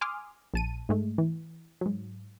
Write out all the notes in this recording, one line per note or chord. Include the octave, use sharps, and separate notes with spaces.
G#5 C6 D6 D#6 F6
A#1 A5 D#7
G#2 G#3 A3
E3
G#2 F#3